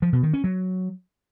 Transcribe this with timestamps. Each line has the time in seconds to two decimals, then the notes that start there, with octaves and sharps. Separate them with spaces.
0.02 F3
0.13 B2
0.23 D#3
0.33 C#4
0.44 F#3